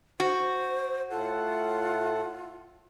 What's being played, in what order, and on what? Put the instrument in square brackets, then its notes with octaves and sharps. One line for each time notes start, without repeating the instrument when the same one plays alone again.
[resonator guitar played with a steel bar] F#4 [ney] C5
[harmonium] A2 A4 F#5 [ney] F4